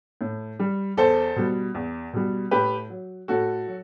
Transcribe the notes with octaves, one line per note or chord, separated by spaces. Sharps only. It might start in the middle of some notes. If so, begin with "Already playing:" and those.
A2
G3
E2 A4 C5
B2 G3
E2
B2 G3
A2 G4 B4
F#3
A2 F#4 A4
F#3